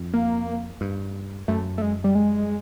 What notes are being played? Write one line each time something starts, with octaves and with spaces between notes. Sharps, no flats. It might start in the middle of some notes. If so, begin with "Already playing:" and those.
Already playing: F2
A#3
G2
F#2 A3
A3
G#3
G3
G#3